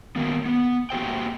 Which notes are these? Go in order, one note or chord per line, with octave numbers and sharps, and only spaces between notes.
D#3 F#3 A#3 B3
B3
A#3 F#4 G4 C5 G5